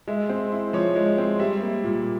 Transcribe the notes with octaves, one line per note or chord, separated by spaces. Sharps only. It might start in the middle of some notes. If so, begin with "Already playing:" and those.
G#3 E5
C4
E4
F3 C#5
G#3
C4
G3 E5
A#3
A#2